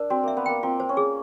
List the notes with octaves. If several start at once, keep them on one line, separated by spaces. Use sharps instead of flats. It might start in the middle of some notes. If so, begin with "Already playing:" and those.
Already playing: D4 A#4
C4 F#4
A#3 E5
B3
A#3 G5
C4 F4
C5
C#4
G#4